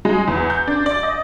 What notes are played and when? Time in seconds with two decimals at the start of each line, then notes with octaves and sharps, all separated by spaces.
0.05 G#3
0.28 E2
0.50 G6
0.67 D4
0.86 D5
1.03 D#5